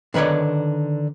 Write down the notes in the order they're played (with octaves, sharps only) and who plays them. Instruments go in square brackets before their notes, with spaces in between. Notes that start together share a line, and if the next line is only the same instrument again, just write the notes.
[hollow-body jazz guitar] D3 D#3 B4 C#5 D5